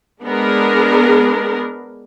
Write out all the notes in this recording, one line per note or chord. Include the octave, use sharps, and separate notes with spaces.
G#3 B3 D4 G#4 A#4